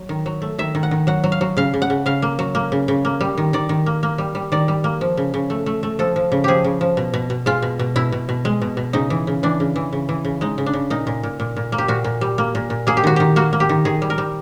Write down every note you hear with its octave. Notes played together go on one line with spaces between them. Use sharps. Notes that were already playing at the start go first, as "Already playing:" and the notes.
Already playing: F#3
D#3
F#3
A3
D#3 E5
D#3
F#5
D#3
F#3 F#5
F#3
F5
F#3
C#3 F5
C#3
F#5
C#3
C#3 F5
A#3
F#3
A#3
C#3
C#3
A#3
G3
D#3
D#3 D5
D#3
A#3
A#3
G3
G3
D#3 D5
G3
A#3
F3
C#3
C#3
A3
A3
A3
F3 A4
F3
C#3
F3 G4 G#4
C#3
F3
B2
B2
B2
G#3 F4
B2
B2
B2 E4
B2
B2
G#3
B2
B2
C#3 D#4
E3
C#3
E3 D4
C#3
E3
C#3
E3
C#3
G#3 D#4
C#3
D4
C#3
A#2 D#4
A#2
A#2
A#2
A#2
A#3
G4
A#2 F#4
A#2
G3
A#3
A#2
A#2
A#3 G#4
G4
D#3 F#4
D#3 G4
A#3 F#4
A#3
G4
D#3
D#3 G#4
G3
A#4
G3